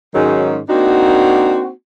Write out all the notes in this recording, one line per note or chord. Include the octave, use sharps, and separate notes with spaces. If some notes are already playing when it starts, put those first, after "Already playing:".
G#2 D#3 F#3 G#3 C#4 D#4
A#3 C4 D4 D#4 F#4